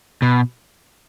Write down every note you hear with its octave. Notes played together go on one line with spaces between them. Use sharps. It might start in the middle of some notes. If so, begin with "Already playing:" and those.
B2